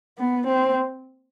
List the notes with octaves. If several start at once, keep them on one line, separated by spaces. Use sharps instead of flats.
B3
C4